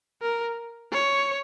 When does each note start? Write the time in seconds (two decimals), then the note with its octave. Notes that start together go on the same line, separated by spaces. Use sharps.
0.22 A#4
0.92 C#5